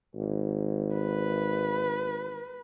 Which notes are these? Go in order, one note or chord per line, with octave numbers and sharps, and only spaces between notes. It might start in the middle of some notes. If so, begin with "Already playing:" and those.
G#1
B4